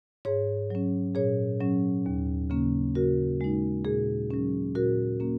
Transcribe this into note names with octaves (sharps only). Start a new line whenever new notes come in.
G#2 G#4 C#5
F#3 C#4
A#2 G#4 C#5
F#3 C#4
D#2
C#3 A#3 C#4
C#3 F#4 A#4
G#3 D#4
A#2 G#4
F#3 C#4
A#2 F#4 A#4
A#3 C#4